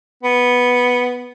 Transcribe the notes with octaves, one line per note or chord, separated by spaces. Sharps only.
B3